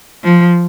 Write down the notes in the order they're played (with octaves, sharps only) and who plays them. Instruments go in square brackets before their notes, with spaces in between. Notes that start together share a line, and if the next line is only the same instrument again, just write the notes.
[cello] F3